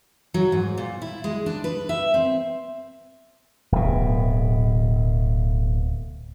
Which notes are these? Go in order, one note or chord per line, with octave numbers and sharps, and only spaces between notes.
F#3
G#2
A#2
E4
G#3
D4
B4
E5
C4
D1 B2